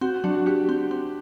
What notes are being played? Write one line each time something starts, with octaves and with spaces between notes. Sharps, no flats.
C4 F#4
F#3 D4
F#4
F#4 G4
C4
C4